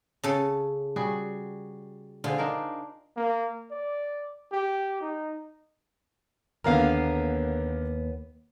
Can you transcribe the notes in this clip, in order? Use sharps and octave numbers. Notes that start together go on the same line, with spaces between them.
C#3 A4
G3 F#4 G#4
D3 F4 G#4 C5
D4 D#4 A#4
A#3
D5
G4
D#4
D#2 D3 A#3 B3 A#4 F5